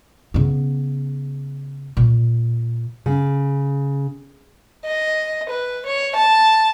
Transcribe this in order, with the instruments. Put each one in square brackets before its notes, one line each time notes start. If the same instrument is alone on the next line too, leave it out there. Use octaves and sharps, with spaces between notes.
[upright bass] C#3 B3
A#2
[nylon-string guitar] C#3
[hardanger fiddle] D#5
B4
C#5
A5